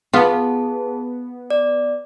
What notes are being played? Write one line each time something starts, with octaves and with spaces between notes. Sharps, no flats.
B3 F4 G#4 A5
D5